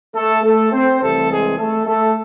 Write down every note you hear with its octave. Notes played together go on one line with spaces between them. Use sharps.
A3 A4
A3 A4
C4 C5
C2 C3 E3 A3 A4
G#3 G#4
A3 A4
A3 A4